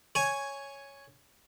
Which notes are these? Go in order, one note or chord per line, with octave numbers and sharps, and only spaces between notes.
C#5 G#5